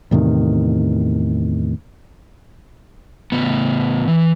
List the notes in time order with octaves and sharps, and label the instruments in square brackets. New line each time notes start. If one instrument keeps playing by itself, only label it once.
[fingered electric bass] E2 A2 C3 D#3
[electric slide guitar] A2 C#3 B3
E3